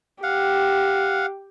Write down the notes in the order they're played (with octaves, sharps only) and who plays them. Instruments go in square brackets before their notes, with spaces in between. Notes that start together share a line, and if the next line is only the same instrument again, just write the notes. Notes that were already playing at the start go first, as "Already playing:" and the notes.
[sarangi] G4 [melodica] F5 F#5